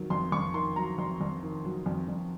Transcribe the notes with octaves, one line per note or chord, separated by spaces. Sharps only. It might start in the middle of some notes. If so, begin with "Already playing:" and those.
Already playing: F2 D#3 F#3
F2 C6
F2 C#6
D#3 C6
F#3 A#5
F2 C6
F2
D#3
F#3
F2
F2